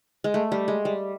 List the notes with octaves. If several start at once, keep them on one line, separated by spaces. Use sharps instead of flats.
G#3
A3
G3
G#3
G3